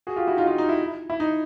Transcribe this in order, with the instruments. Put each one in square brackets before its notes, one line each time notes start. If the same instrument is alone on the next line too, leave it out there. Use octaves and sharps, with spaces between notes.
[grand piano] F#4 G#4
F4 G4
E4 F#4
D#4 F4
D#4 F4
D#4
E4
E4
D#4